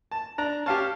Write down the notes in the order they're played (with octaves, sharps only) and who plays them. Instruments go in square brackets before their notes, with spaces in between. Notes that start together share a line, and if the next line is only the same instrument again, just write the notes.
[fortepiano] A5
[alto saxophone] D4 [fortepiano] A#5
[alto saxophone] C#4 [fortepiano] G4 F5 A5